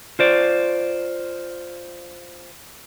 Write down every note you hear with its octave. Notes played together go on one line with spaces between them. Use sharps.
F4 C5 D5